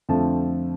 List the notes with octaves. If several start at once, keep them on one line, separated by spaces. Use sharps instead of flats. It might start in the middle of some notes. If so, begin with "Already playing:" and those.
F2 D3 F3 A3 C4 A5